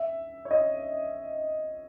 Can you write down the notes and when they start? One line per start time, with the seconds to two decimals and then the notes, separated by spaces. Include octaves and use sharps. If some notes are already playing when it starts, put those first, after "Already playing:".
Already playing: E5
0.45 C#5
0.51 D#5